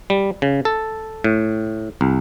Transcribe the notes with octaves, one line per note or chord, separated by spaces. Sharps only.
G3
C#3
A4
A2
C2